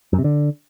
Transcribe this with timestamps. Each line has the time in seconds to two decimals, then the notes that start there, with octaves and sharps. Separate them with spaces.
0.13 F#2
0.19 C3
0.24 D3